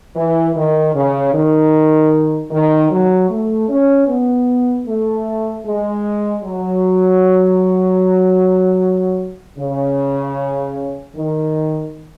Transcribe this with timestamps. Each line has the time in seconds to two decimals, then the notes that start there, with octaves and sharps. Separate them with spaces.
0.15 E3
0.55 D#3
0.93 C#3
1.33 D#3
2.51 D#3
2.90 F#3
3.30 A3
3.68 C#4
4.07 B3
4.87 A3
5.65 G#3
6.44 F#3
9.58 C#3
11.15 D#3